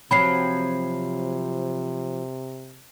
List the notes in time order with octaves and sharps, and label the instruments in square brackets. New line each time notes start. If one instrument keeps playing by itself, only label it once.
[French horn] C3 [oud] F3 F#3 C4 [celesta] B5 C7